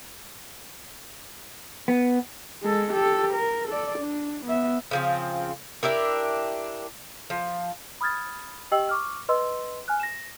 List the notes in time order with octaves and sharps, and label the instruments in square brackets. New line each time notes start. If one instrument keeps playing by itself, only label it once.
[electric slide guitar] B3
[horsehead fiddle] G#3 A4
G4 A4
A#4
A4 D5
D4
B3 E5
[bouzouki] C#3 F3 C4
D4 E4 G4 A#4
F3
[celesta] B5 D#6 F6 G#6 A6
G4 D#5 G5 E6 F#7
C#6 D6 F6
B4 D#5 C6 E6
G#5 F6 F#6
A#6 E7